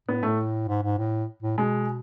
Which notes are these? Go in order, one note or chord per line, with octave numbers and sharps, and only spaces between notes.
A2 B3
A2 A3
G#2
G#2
A2
A2
B2 G#3